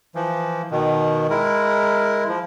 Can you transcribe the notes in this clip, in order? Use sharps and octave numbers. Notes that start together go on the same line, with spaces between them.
E3 F3
B2 D#3
G#3 E4 A#4
F3